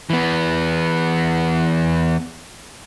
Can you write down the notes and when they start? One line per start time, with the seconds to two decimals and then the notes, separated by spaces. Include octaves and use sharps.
0.10 E3 B3